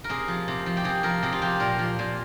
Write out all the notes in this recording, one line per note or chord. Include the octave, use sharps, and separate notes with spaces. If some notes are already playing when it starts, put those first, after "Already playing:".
A#4
C3 G#4
F3
C3
F3
G4
C3 G#4
F3 A#4
C3 G#4
F4
F3 G4
A#2 A#4
F3
A#2